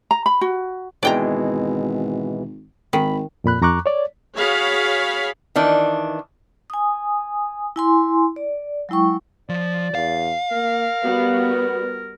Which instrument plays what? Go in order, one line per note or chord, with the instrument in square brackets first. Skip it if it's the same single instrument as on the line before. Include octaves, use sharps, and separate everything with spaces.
[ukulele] A#5
B5
F#4
[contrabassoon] G#1 [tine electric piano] B2 E3 G#3 [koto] D5 G5 A#5
[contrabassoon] G#1 [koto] D#3 [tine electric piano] B5
[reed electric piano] F2 A#2 B5 F#6
F2 A#5 C#6 D6 F#6
C#5 D5
[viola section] F#4 G#4 C#5 F5 B5
[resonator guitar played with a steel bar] D#3 E3 D4
[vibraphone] G#5 D#6
E4 G#5 C6
D5
F#3 G#3 E4 G5 C#6
[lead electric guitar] F3 [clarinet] D5
[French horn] E2 [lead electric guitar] F5
[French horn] A#3 [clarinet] A#4
[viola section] G3 B3 F#4 [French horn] B4